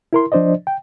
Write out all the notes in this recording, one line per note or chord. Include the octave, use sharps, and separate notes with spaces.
E4 A#4 C6
F3 D4 C5 D5 D#5
G5